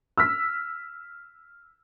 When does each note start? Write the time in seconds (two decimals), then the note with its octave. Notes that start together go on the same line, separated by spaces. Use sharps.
0.18 E6 F6 B6